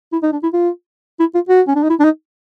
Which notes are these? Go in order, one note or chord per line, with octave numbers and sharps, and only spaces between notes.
E4
D#4
D4
E4
F4
E4
F4
F#4
C#4
D4
D#4
E4
D4
D#4